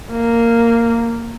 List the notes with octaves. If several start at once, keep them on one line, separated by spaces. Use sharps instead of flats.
A#3